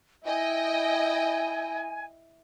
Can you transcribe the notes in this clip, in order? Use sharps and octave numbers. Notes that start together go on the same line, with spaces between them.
E4 D#5 G5 G#5